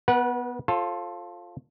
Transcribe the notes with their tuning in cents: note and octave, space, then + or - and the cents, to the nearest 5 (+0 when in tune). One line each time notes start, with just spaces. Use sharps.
B3 +0 B4 -35 F#5 +0
F4 +5 A4 +0 C5 +40